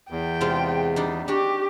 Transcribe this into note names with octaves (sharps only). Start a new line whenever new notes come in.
E2 G5
C3 G#3 F4
G3 D4 D#4
D4 F#4 G4